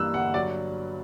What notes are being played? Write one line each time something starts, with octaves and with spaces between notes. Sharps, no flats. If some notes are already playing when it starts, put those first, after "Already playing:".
Already playing: G2 E3 A#3 E6 F#6
G1 F#5
F#3 D5